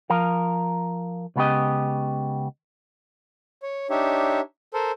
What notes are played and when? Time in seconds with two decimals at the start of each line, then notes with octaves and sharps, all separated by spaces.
0.10 F3 A#4 F5
1.36 C#2 C#3 B3 F4 G4 D#5
3.63 C#5
3.90 D4 D#4 G4 C#5 E5
4.74 A4 A#4 C5